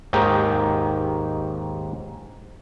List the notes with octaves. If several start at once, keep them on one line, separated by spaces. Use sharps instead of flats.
D#2 G#2 D#3 D#4 G4